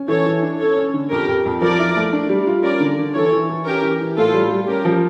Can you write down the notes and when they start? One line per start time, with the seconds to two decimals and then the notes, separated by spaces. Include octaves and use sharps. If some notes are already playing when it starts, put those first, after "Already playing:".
Already playing: C#4
0.08 E3 A4 C#5
0.26 E3
0.42 D4
0.60 C#4 A4 C#5
0.77 C#4
0.94 D3
1.10 F2 G4 A#4
1.28 F2
1.45 F2
1.61 F3 A#4 D5
1.79 E4
1.96 A3
2.13 D4
2.29 G3
2.47 F4
2.63 C#4 A#4 D5
2.80 D3
2.99 D3
3.15 E3 A4 C#5
3.32 E3
3.49 E3
3.66 C#4 G4 A#4
3.82 E3
4.01 E3
4.17 A2 F4 A4
4.34 G3
4.51 G3
4.67 C#4 G4 A#4
4.85 F3